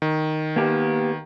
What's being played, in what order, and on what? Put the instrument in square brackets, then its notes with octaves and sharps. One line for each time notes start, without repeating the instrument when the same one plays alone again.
[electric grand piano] D#3
[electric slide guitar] A#3 B3 G4